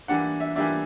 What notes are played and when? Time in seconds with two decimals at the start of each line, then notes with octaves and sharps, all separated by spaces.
0.08 E3 G3 A#3 D4 F#5
0.40 E5
0.56 E3 G3 A#3 D4 E5